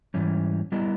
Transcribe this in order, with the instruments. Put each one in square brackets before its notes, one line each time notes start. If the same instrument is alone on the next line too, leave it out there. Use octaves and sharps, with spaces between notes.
[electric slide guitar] G#2 E3 G3 C#4
G3 B3 E4 A#4 D#5